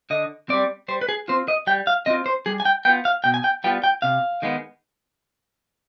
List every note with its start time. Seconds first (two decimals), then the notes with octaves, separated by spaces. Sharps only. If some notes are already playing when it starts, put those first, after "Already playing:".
0.10 D3 D#5
0.49 G3 C4 D5
0.88 G3 C5
1.01 B4
1.09 G#4
1.28 C4 F4 C5
1.48 D#5
1.67 G3 G5
1.87 F5
2.06 C4 F4 D#5
2.26 C5
2.46 G3 G#4
2.60 G#5
2.65 G5
2.85 B3 F4 G5
3.05 F5
3.24 B2 G5
3.34 G#5
3.44 G5
3.64 G3 B3 F4 G5
3.84 G5
4.02 C3 F5
4.42 D#3 G#3 B3